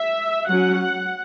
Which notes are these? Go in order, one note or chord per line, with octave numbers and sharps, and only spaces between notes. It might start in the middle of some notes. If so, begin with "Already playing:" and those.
Already playing: E5
F#3 C#4 F#5